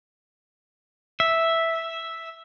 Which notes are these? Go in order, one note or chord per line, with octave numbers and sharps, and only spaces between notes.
E5